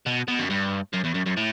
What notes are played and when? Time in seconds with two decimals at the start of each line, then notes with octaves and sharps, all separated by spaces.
0.06 B2
0.28 B2
0.39 F#2
0.50 G2
0.93 F#2
1.04 E2
1.14 F#2
1.26 F#2
1.37 A2